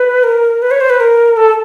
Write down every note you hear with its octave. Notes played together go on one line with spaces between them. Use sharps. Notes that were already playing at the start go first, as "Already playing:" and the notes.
Already playing: B4
A#4
B4
C#5
C5
B4
A#4
A4